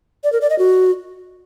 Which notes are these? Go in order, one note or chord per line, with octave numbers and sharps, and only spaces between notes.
D5
A#4
D5
D#5
F#4